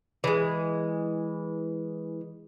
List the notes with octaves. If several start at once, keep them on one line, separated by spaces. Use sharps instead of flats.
E3 G#3